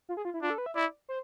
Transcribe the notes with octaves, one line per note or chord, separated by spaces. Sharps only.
F4
G#4
F4
E4
D4 F4
A4
B4
E5
E4 D5
C5